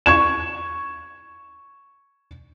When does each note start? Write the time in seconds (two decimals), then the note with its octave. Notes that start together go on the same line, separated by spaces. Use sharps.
0.06 C#6 G#6 E7